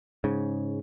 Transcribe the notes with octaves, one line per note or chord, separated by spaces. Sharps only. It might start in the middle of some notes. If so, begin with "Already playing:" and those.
G#2 C#3